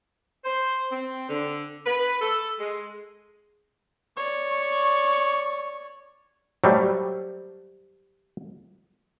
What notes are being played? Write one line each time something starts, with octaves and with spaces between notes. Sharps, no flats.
C5
C4
D3
B4
A4
G#3
C#5 D5
C#6
F#3 G3 A3 G4 C5